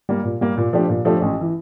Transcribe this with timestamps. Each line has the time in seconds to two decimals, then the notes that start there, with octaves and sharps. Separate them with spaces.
0.09 G3 A#3
0.25 A#2
0.41 G3 A#3
0.57 A#2
0.73 F3 A3 D4 G4
0.89 A#2
1.05 F3 A3 D4 G4
1.22 A1
1.41 E3